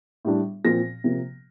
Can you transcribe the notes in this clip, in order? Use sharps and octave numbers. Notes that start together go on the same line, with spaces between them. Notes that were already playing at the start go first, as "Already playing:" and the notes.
A2 G3 D4
A#2 F3 C4 A#6
C3 F3 A#3